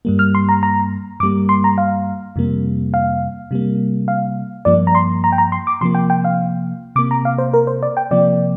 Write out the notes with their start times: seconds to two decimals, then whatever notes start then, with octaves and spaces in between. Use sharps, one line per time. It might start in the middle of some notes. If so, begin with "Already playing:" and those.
0.05 G2 G3 A#3
0.19 F6
0.35 C6
0.49 A#5
0.63 A#5
1.20 G2 D6
1.23 G3 A#3
1.49 C6
1.64 A#5
1.78 F5
2.36 F2 C3 G3 A#3
2.94 F5
3.51 C3 G3 A#3
4.08 F5
4.65 G2 F3 A#3 D5
4.87 A#5
4.95 C6
5.24 A#5
5.32 G5
5.38 A#5
5.52 C6
5.67 D6
5.81 C3 F3 A#3 C6
5.95 G5
6.10 G5
6.25 F5
6.96 C3 D6
6.99 A#3
7.11 A#5
7.25 F5
7.38 C5
7.54 A#4
7.67 C5
7.83 D5
7.97 G5
8.11 C3 F3 A#3 D5